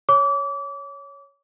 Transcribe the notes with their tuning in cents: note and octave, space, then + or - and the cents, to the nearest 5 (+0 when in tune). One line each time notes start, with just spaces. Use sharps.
C#5 +0 D6 -30